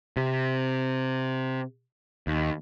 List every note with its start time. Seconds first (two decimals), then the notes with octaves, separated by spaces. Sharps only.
0.17 C3
2.27 D#2